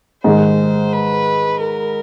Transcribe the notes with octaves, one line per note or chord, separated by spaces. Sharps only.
G#2 D#3 G#3 C5
B4
A#4